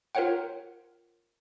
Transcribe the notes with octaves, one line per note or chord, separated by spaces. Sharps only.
F4 A#4 C5 C#5 F#5 G5